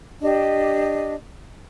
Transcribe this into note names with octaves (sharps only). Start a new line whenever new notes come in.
D4 G4 D#5